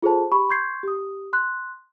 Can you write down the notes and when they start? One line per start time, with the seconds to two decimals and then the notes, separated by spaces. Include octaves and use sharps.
0.02 F4 G#4 A4 C5 A5
0.32 G4 B5 C#6
0.49 C6 C#6 G6 G#6 C7
0.83 G4 D#6
1.33 C6 F#6